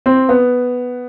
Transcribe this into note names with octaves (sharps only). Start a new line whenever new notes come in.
C4
B3